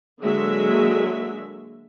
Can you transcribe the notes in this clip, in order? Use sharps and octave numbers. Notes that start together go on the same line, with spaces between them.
D3 F#3 G#3 A#3 G#4 E5